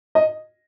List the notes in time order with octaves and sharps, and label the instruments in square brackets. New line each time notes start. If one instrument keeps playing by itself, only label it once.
[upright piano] D#5